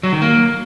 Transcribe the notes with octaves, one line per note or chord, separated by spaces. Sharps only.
F#3
D#3
A#3